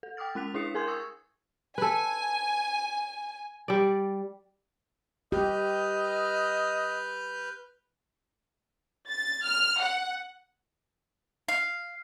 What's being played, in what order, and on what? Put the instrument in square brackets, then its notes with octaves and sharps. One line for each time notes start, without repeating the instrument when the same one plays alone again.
[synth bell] A4
G5 D6 D#6 F6 A6
G#3 C#4 F#6 B6 F7
D4 E4 G#4 D#6 C7 C#7
G#4 A#4 G#5 C6 G6 G#6
C#6 D#6 E6 G#6
[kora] A4 B4 [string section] G#5
[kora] G3 D5
[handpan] G4 [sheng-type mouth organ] B4 F6 G6 [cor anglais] D#5
[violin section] A6
F6
F#5
[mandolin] F5